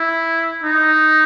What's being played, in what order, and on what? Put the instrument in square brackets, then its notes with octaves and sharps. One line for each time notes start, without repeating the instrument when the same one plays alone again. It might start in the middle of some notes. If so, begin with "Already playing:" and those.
Already playing: [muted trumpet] E4
D#4